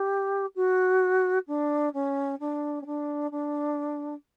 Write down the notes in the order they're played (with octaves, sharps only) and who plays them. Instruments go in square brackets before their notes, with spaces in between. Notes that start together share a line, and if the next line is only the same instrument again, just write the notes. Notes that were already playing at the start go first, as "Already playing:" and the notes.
Already playing: [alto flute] G4
F#4
D4
C#4
D4
C#4
D4
D4